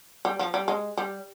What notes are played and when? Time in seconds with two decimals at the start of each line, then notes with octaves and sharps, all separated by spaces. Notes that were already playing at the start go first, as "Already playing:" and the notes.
0.25 G3
0.39 F3
0.54 G3
0.68 G#3
0.97 G3